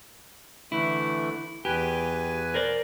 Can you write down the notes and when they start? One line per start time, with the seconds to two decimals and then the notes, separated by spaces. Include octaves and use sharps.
0.72 D3 E3 A3 E4
1.65 E2 G4 B4 G#5
2.54 A#4 C5 D5